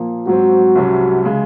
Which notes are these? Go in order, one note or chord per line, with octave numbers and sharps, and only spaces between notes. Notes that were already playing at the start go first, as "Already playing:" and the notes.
Already playing: A#2 F3 A#3
G#2 F#3 C4 F#4
C2 C3 F#3 C#4
C#3 G#3